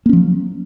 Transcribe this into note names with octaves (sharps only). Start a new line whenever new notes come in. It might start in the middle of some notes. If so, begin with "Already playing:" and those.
F3 F#3 A#3 C#4